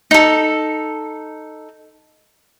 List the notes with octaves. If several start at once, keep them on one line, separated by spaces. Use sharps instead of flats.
D#4 A4